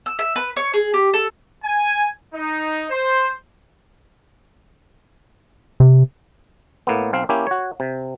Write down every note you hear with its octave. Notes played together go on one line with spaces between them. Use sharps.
E6
E5
B4
C#5
G#4
G4
A4
G#5
D#4
C5
C3
A2 A#3 B3
B1 C4 F5
A#3 C#4 E4 G4
F#4 C#5
C3